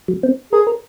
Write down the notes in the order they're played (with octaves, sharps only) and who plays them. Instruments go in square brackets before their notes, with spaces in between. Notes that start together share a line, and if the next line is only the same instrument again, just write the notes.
[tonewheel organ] F#3
C4
[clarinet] G#4 [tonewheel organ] A#4
[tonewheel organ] A#4